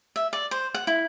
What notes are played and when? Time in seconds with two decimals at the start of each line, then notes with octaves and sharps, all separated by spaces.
0.16 E5
0.33 D5
0.51 C5
0.74 F#5
0.87 E4